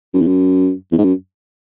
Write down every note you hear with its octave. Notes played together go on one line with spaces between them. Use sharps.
F#2
E2
F#2
E2
G#2
F#2